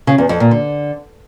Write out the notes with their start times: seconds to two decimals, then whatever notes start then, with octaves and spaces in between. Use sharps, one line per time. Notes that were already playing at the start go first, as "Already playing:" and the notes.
0.07 C#3
0.18 E2
0.29 F2
0.40 A#2
0.51 D3